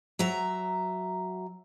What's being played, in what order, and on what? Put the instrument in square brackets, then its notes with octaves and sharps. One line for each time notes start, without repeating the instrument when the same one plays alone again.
[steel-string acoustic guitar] F#3 E5 A#5